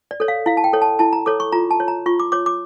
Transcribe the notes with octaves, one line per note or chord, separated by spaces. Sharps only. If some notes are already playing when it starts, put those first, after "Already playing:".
D5
A4 C#5
F5
E4 F5
A5
G5
A4 C#5
A5
E4 A5
A#5
A4 C#5 D6
C#6
F4 A#5
A5
C#5
A#5
F4 C#6
D6
C#5 D6
D6